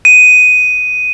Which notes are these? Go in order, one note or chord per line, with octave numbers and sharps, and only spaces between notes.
D#7